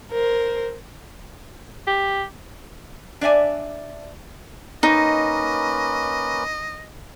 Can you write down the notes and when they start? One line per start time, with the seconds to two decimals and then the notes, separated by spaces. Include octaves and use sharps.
0.11 A#4 C5
1.87 G4
3.21 D4 D5 E5 G#5
4.83 A#3 C#4 D#4 B4 D#5